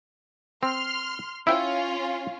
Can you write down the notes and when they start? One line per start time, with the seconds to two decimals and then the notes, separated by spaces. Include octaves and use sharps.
0.63 C4 C6 F6
1.47 C#4 E4 F4 E5 G5